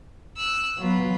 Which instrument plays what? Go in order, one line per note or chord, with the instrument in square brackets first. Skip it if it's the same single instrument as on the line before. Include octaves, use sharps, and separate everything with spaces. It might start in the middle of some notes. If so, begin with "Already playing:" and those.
[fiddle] E6 F#6
[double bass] F#3 B3 [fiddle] F4 B4